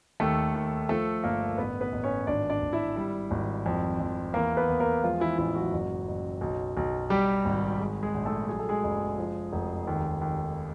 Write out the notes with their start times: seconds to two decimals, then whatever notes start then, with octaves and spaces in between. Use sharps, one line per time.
0.20 D#2 A3 A4
0.54 D#2
0.89 F3 A3 A4
1.24 G1 A#3 A#4
1.57 A1 B3 B4
1.81 B3 B4
1.92 A1
2.04 C#4 C#5
2.27 G#1 D4 D5
2.50 D4 D5
2.62 G#1
2.73 E4 E5
2.96 G3
3.31 G#1
3.66 F2
4.00 F2
4.34 E2 A#3 A#4
4.57 B3 B4
4.69 E2
4.80 A#3 A#4
5.03 F3 G#3 F4
5.20 E3 E4
5.38 A1 E3 E4
5.55 F#3 F#4
5.73 F#1
6.08 F#1
6.41 B1
6.77 B1
7.10 G3 G4
7.45 G#1
7.80 G#3
8.03 G#3 G#4
8.14 A#1
8.25 A3 A4
8.49 F#3 G#4
8.59 A4
8.69 G#3 G#4
8.83 F#1
9.18 F3
9.53 F1
9.87 D#2
10.21 D#2